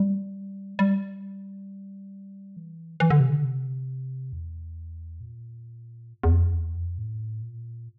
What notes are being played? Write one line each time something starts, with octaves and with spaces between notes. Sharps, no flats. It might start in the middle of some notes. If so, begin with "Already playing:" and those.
Already playing: G3
G3
E3
E3
D3
C3
D3
C3
E2
A#2
E2
F2
E2
F2
A2
A#2